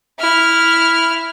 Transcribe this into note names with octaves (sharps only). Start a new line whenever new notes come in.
E4 F6